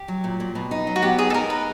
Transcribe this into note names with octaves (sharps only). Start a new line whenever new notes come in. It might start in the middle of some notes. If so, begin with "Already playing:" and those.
Already playing: G4
F#3
A#2
A#2
B2
D#4
F#3
F#4
B3 G4
D#4 G#4
A4
D#4 A#4
B4